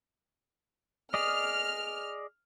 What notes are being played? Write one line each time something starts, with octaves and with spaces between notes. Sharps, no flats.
G#4 D5 D#5 F6